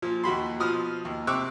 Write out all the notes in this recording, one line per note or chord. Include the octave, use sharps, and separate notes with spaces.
A#2 F3
D#2 F#4 B5 C6
B2 F3 D#6 F6
D#2
C3 C4 C#6 D6 E6 F#6